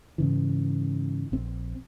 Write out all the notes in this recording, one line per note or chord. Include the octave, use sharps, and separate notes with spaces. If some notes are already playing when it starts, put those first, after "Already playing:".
G#2 C#3 E3
A#1 C4